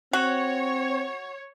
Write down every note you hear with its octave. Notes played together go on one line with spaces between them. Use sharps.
C4 F#4 C#5